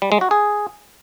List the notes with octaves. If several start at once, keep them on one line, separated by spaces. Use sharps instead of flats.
G3
G#3
F#4
G#4